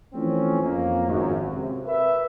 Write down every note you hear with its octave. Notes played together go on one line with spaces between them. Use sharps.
E3 F3 A3 C4 C#4
F2 A#3
G#1 F#2
C3
A#4 B4 E5